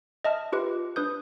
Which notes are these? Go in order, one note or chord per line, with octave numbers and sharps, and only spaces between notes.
D#5 E5 A5 F6
F4 G4 B4
D4 B4 D#6 G6